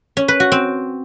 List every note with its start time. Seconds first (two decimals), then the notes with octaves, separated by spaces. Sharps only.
0.17 C#4
0.28 B4
0.40 F#4
0.52 C4